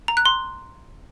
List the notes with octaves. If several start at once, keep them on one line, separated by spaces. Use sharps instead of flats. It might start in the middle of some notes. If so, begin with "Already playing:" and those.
A#5
F#6
C6